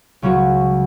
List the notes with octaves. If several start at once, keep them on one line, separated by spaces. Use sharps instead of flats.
C#2 C#3 F#3 C#4 F#4